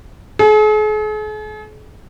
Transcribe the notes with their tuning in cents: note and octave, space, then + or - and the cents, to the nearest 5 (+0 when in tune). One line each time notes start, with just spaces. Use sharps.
G#4 +45